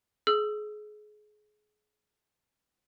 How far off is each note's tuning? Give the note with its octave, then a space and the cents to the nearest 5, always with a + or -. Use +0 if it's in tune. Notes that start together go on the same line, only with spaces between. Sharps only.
G#4 +30 E6 +30